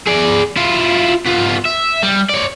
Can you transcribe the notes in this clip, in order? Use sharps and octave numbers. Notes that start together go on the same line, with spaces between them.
G#4 D5
E4 F4
B3 F4
E5
G3
C#5 D5